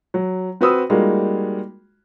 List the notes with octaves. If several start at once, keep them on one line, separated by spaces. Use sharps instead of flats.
F#3
C4 F#4 B4 C5 D#6 E6
G3 G#3 A#3 D#4 F4 F#4